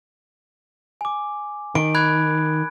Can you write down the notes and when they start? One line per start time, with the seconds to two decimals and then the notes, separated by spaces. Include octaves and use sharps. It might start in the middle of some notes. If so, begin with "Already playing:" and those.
1.01 G#5 D6
1.75 D#3 D7
1.95 B5 F#6 G#6